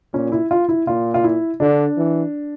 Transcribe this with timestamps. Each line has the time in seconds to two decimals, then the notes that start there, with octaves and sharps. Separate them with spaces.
0.13 A#2 C#4
0.32 E4
0.51 F4
0.69 E4
0.87 A#2 F4
1.14 F4
1.24 E4
1.60 D3 D4
1.97 E3